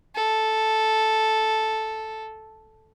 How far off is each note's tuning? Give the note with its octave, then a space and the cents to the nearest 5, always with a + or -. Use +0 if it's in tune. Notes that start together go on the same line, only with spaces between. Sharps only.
A4 -5